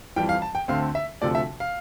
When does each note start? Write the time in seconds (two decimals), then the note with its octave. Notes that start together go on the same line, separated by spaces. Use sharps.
0.16 F2 E3 G3 G5
0.29 F5
0.42 A5
0.55 G5
0.68 D2 D3 A3 C4 F5
0.95 E5
1.21 D2 C3 F3 A3 D5
1.35 E5
1.60 F5